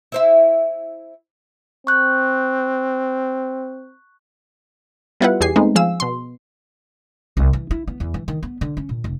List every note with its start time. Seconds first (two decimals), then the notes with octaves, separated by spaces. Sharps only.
0.12 E4 C5 E5
1.87 C4 C#6 F#6 G6
5.21 G3 B3 E4 F4 B4 F#5
5.41 E2 G4 G#4 G#5 C7
5.56 G#3 A3 B3 C4 D#4
5.75 F3 G#4 F5 E6
6.00 B2 C6
7.37 C2
7.53 E3
7.71 E4
7.87 B3
8.00 E2
8.14 E3
8.28 D#3
8.43 B3
8.61 D3
8.77 C#4
8.89 A#2
9.04 F1